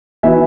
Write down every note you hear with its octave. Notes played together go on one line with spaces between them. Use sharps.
E3 B3 D#4 F#4 E5 G#5